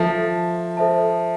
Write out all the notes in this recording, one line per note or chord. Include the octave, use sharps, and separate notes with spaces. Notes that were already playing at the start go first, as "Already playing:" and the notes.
Already playing: F3 A4 C5 E5 A5
A4 C5 E5 A5